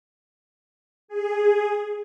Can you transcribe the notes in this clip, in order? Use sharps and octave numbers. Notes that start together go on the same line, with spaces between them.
G#4